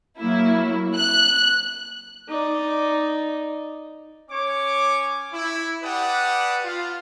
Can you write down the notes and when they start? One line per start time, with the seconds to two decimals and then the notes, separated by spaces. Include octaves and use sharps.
0.19 F#3 A#3 E4
0.96 F#6
2.29 D#4 D5
4.30 C#4 C#5 D6
5.33 E4
5.83 G4 B4 D5 F#5 A5 D#6
6.64 F4